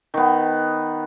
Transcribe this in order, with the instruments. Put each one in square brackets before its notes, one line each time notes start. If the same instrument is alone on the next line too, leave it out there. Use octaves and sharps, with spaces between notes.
[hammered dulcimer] D#3 B3